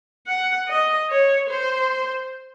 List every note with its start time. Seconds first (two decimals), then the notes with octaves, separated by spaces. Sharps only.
0.27 F#5
0.68 D#5
1.10 C#5
1.50 C5